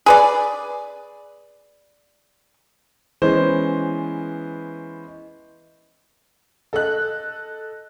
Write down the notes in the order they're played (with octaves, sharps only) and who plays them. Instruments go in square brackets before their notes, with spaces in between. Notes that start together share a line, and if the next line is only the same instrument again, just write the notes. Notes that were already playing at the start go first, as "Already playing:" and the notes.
[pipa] G#4 B4 D5
[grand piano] E3 G#3 B3 C#4 C5
[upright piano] A4 D#5 F#6